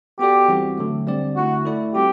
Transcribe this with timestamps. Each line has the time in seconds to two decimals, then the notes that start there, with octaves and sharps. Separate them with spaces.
0.19 B3 F#4 G4 A4 D5
0.48 E3 G3 C4 F#4
0.78 D3 F#3 A3
1.07 D3 G3 C4 G4 D5
1.36 D3 A3 E4 F#4
1.65 A3 E4 A4 D5
1.95 G3 C4 F#4 G4